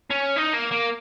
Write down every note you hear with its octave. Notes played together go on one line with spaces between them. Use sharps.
C#4
D#4
A#3
A#3